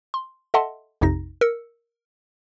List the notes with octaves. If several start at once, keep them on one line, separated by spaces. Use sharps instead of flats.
C6
A4 D#5 E5 F#5 A5 C6
A#1 F2 C3 D#4 A#6
A#4 E6 C#7